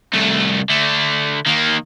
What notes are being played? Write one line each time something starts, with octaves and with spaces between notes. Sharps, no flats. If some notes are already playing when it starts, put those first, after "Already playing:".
C2 A3
D3 A3
D#3 A#3